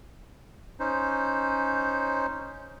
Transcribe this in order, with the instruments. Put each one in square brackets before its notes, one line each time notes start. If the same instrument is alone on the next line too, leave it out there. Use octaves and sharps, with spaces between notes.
[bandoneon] C#4 D#4 C5